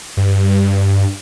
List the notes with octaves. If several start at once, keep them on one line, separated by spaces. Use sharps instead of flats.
G2